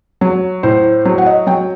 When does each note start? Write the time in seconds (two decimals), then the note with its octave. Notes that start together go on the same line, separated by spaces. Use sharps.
0.21 F#3
0.63 A2 C5
1.05 F#3
1.18 F#5
1.26 D#5
1.47 F#3 G5